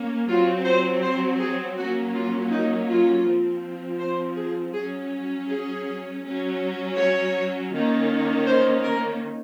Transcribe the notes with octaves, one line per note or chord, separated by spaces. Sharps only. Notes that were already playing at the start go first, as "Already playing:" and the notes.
Already playing: A#3 C#4
F#3 C4 F4
C5
C5
G#4
F#3 A#3 C#4 F#4
F4
D#4
F4
F3 C4
C5
G#4
F#3 C#4 G#4
G#4
F#3 C#4
C#5
D#3 A#3 C#4
C5
A#4